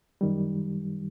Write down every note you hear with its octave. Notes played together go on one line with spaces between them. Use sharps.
F#2 D#3 G3